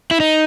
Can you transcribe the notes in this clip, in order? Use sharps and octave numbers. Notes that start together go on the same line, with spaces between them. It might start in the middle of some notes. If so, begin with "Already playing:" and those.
E4
D#4